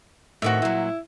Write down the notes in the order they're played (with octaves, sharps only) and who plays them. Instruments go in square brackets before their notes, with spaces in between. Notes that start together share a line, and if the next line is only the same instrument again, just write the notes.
[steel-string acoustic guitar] A2 D#3 C4 [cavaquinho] F#4 E5
[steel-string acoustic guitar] A#2 F#3 [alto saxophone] E4